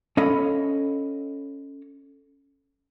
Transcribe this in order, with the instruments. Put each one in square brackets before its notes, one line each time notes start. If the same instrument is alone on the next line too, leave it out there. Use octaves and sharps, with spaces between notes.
[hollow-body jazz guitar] C#4 A4 C#5 D#5 F5 B5